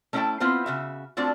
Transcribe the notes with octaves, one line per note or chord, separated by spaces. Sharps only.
A3 C#4 E4 D5 G5 A5
B3 C4 E4 F4 C5
C#3 F#4 E5
A3 C4 D4 F4 F#4 A4